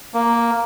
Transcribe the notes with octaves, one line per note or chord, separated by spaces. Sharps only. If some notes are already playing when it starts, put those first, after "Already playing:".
A#3